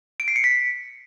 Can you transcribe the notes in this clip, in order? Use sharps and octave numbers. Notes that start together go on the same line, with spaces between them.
D7
C7
C#7
B6